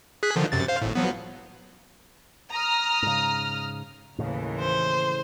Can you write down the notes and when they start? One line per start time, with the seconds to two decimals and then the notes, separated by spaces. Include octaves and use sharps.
0.23 G#4 F#6 B6
0.36 D3 D#3 F3
0.52 F#2 C3 A6
0.68 C5 F5
0.82 G#1 A2
0.95 F3 F#3 B3
2.53 A#5 D#6 F6
3.02 G#2 C#3
4.19 D#2 A2 C#3 E3
4.60 C5